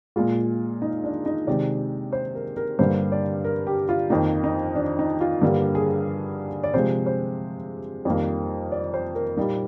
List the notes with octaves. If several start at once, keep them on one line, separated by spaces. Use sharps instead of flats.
A#2 G#3 F4
D#4
D4
D#4
C3 D#3 G#3 D5
C5
A#4
A#4
G2 D3 G3 A#3 C5
D5
A#4
G4
F4
F2 D#3 A#3 D#4
D#4
D4
D#4
F4
G2 D3 G3 A#3
G#4
D5
C3 F3 G#3 C5
C5
F2 D#3 G3 A#3
D5
C5
A#4
A#2 G3 A#3 D#4